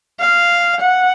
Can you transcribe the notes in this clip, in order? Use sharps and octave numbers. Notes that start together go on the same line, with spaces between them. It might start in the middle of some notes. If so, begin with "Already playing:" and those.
F5
F#5